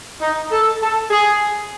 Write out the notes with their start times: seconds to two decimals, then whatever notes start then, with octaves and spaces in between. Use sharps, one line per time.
0.21 D#4
0.51 A4
0.81 A4
1.10 G#4